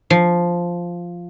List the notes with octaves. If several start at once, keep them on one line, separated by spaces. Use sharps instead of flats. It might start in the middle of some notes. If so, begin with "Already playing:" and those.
F3